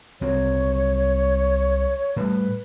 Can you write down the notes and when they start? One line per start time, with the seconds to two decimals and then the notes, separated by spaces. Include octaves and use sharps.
0.21 C2 F#3 C4 C#5
2.16 A2 G3 B4